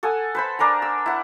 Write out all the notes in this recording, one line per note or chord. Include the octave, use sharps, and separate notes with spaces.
A4 F#5 G#5 D#6
B4 C5 B5
D4 A#4 G#5 A#5
E6
E4 F#5